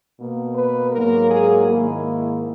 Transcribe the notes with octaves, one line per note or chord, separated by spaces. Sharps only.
B2 A#3
B4
G#2 F#3 A#3 A#4
G#4
G#2 D#3 A#3 E4